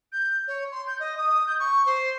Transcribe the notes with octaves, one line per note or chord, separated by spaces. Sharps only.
G6
C#5
C6
G6
D#5
D#6
G6
C#6
C5